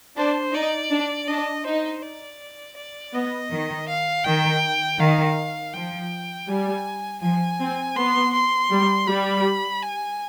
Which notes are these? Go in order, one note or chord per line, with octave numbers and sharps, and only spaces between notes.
D4 C5
D#4 D5
D4
D4 D#5
D#4 C5
D5
D5
B3 D#5
D#3
F5
D#3 G5
D#3 F5
F3 G5
G3 G#5
F3 G#5
C4
B3 C6
C6
G3
G3 B5
G#5